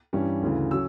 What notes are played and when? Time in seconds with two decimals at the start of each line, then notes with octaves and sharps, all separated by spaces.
0.13 G2 E3 G3 C#4
0.42 D2 C#3 E3
0.71 F#3 C#4 E6